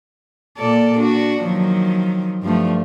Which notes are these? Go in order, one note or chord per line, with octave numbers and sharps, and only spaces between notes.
A#2 A4 D5
D4 F#4
D#3 F3 F#3
G2 F3 A3